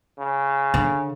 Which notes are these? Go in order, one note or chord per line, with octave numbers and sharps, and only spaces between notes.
C#3
D3